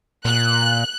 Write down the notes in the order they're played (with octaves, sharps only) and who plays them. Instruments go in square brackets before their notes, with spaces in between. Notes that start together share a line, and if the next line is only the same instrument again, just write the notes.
[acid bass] A#2 [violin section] F#6